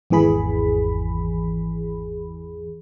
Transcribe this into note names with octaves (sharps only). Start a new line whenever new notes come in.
G#1 E2 E3 G#4 B5